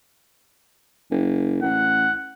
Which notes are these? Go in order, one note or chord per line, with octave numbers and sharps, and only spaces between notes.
F#1
A1 F#5